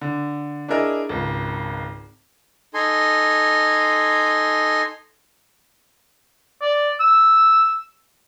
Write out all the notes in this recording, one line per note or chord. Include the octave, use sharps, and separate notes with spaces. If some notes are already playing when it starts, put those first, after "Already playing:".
D3
D4 E4 G#4 A#4 D#5
G#1 C#2
D#4 A4 G#5 C6
D5
E6